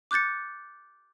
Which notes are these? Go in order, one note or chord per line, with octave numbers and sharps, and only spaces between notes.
D6 F#6 G6 A6 C#7